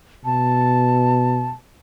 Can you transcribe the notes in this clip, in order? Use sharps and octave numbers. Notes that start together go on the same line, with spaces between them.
B2 A5